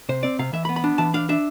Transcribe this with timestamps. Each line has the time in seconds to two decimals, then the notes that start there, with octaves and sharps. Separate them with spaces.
0.09 C3 C5
0.23 C4 D5
0.39 C3 F5
0.53 E3 E5
0.65 B5
0.69 B3
0.76 B5
0.84 D4
0.98 E3 A5
1.14 D4 F5
1.29 D4 E5